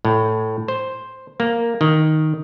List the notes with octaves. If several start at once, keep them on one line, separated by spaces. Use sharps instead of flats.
A2
C5
A#3
D#3